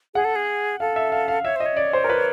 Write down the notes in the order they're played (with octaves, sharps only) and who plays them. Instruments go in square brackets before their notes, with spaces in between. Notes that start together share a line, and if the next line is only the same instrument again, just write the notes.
[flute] G#4 [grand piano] F#5
[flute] A4
G#4
[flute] A4 [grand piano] F5
[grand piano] E5
F5
F5
[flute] C#5 [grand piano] E5
[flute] C5 [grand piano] D#5
[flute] C#5
[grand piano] D5
C5
A#4
B4